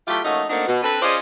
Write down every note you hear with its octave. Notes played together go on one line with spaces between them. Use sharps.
F#3 A3 E4 F4 G4
F3 A3 A#3 C#4 D#4 F#4
A3 A#3 C4 D4 D#4 F#4
B2
C4 D4 A4 B4
C#4 F4 G#4 C5 D5 D#5